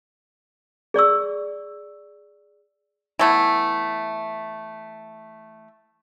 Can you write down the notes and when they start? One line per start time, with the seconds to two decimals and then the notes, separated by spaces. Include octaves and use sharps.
0.94 G#4 D5 C#6 E6
3.19 E3 A3 B3